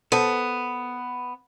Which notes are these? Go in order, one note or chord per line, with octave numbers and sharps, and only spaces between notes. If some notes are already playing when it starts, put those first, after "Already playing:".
B3 A4 C5 A5